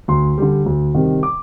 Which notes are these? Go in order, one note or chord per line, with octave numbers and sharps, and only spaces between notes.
D2 C6
D3 G3
D2
C3 D#3 G3
D6